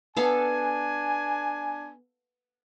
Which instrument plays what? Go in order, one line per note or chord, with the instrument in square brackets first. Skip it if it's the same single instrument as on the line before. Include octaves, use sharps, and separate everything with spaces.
[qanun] B3 A4 F5 [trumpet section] D4 G#5